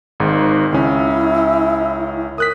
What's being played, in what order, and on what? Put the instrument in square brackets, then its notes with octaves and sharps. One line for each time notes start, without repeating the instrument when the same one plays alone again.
[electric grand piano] G#1 G#2
[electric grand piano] C#2 C#4 [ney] E4
[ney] A#4 [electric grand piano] D#6 F#6 B6